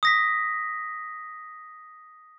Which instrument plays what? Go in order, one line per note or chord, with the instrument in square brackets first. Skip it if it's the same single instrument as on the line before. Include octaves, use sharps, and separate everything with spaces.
[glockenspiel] D#6 A#6 B6